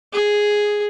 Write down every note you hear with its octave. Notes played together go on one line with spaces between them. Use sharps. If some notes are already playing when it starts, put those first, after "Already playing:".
G#4